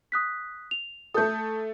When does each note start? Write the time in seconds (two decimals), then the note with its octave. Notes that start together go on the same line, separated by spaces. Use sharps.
0.12 D#6 F#6 B6
0.71 F7
1.14 A3 A4 D#6 G6